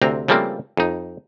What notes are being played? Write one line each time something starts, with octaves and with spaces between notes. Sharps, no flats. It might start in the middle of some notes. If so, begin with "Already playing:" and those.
D2 C3 C4 A#5
C#3 F3 G3 A3 A#3 C4
F2 D#4